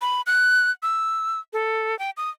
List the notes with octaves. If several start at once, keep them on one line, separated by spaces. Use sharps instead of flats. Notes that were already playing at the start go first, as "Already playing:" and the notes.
B5
F#6
E6
A4
G5
D#6